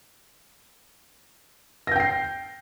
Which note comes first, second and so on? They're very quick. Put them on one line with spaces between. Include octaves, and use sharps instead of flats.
A#6 G6 G5 C7